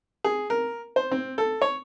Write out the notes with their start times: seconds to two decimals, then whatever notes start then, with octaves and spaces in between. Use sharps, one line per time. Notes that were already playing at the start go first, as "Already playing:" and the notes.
0.24 G#4
0.50 A#4
0.96 C5
1.11 C4
1.38 A4
1.62 C#5